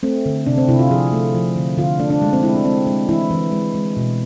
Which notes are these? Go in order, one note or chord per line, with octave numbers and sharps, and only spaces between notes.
A3 C4
D3
C3 D4
C4
C3 E4
F4
F3 G#4
A3
F3
D3
D3 F4
A3 D4
D4
G#3
C4
G#3 E4
D4
G#3 C4
G#3
E3 E4
E3
G#3
G#3
B2